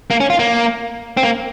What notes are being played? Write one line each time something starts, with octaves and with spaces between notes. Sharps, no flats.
A#3
C#4
F4
A#3
C4
A#3